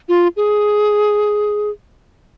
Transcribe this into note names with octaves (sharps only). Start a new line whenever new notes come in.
F4
G#4